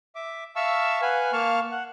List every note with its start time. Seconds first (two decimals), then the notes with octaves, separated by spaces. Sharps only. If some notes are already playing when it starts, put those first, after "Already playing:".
0.15 E5 D6
0.56 E5 F5 A5 C#6 E6
1.02 B4 F5 F#5 G#5
1.33 A#3 F5 A5 C#6 F6
1.72 F#5